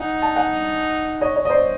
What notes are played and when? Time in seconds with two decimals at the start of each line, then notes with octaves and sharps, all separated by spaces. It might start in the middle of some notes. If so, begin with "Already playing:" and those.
Already playing: D#4 F#5 G#5
0.22 A5
0.36 F#5 G#5
1.21 C#5 D#5
1.35 C#5 D#5
1.45 D#5
1.49 C5 D5